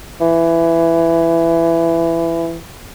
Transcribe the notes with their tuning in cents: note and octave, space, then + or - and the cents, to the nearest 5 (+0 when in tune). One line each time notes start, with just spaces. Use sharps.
E3 +15